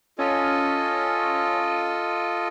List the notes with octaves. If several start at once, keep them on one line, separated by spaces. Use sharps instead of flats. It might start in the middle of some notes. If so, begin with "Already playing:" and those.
C#4 F4 A4 D#5